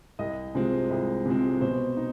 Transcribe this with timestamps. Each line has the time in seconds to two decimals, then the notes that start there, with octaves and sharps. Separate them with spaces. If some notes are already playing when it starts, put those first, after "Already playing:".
0.19 C2 D#5
0.55 C3 F3 G#3 C4
0.90 C2
1.26 C3 F3 G#3 C4
1.61 B2 C5
1.97 D#4